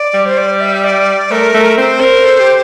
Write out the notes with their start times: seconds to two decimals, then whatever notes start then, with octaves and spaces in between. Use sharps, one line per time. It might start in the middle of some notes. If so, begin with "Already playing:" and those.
Already playing: D5
0.14 G3
0.26 C5
0.38 D5
0.61 E5
0.84 D5
1.31 A3 A#4
1.54 A3
1.78 C4 C5
2.01 A#4
2.25 A4
2.40 G4